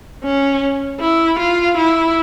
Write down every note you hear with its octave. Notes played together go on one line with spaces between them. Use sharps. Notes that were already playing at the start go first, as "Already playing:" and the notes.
C#4
E4
F4
E4